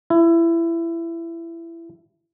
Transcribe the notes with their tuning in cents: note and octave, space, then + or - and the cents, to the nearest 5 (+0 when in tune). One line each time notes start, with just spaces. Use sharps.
E4 +20